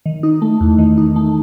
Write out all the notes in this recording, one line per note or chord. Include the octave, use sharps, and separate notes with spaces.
D#3
D#4
A3
E2
D#3
D#4
A3